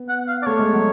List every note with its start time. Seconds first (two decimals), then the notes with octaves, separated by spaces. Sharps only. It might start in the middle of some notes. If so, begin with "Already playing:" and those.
Already playing: B3
0.09 F#5
0.28 F5
0.42 D5
0.46 A3 C#5
0.59 G#3
0.73 F#3